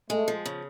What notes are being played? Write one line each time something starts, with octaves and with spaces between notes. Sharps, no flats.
G#3 A3
F3
C#3